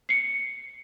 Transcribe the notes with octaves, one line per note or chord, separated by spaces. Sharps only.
C7 C#7